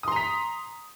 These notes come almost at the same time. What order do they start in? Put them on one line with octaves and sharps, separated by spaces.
D#6 C6 A#5 B6